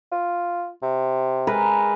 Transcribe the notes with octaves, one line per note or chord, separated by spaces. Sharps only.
F4
C3
G#3 A#4 B4